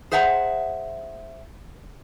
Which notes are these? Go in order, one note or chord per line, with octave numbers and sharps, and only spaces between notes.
G#4 C5 E5 F#5 G5 A#5